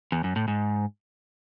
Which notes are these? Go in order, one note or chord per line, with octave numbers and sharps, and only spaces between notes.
E2
F#2
A2
G#2